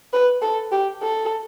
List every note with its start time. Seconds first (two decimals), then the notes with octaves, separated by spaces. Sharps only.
0.13 B4
0.42 A4
0.72 G4
1.02 A4